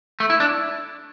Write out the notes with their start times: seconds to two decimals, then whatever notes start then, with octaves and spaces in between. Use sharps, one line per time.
0.20 A3
0.30 E4
0.40 D4